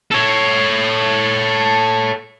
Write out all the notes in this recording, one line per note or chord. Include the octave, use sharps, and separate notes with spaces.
A4 C#5